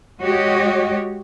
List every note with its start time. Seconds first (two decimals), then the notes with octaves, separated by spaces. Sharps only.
0.21 G#3 F#4 G4 C#5 D#5